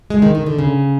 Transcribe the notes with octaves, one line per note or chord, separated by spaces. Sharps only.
G#3
D#3
D#3
D3
C#3